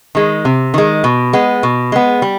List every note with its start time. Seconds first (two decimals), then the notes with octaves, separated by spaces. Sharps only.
0.15 D#3 G#3
0.45 C3
0.74 D#3 G#3
1.04 B2
1.33 G#3 B3
1.63 B2
1.92 G#3 B3
2.22 G3